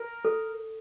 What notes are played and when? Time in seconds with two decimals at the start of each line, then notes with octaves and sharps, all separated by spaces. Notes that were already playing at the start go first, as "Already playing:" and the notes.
Already playing: A#4
0.25 A4